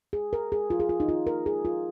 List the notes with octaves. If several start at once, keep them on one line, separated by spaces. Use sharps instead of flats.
G#4
A#4
G#4
F4
G#4
F4
D#4
F4
A#4
G#4
F4